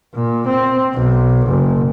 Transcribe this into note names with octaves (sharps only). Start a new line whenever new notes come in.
A#2
C4
B1
F#1